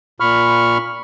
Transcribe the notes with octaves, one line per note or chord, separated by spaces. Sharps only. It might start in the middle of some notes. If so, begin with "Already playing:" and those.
A#2 B5 C#6 F6